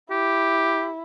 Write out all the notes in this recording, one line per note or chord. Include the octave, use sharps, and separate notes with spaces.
E4 G4